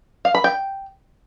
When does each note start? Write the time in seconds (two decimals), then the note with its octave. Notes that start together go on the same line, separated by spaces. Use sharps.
0.25 F5
0.35 B5
0.44 G5